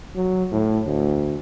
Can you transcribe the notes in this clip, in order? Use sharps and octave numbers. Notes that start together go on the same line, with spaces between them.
F#3
A2
D2